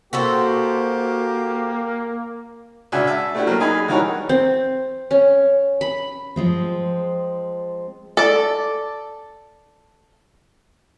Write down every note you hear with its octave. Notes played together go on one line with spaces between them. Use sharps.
A#3 F#4 G4 A4 C5
C#2 D4 F#4 E5 G#5 E6
E5 A5
A3 D4 E4 F#4 G4
F#3 A#3 F6
D#4 G#4 G#5 B5
E3 G3 D#4 F#4 A#4 C#5
C4
C#4
B5
F3 G#3 C4
A4 D5